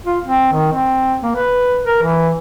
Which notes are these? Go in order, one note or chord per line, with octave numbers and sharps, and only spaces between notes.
F4
C4
D#3
C4
A#3
B4
A#4
E3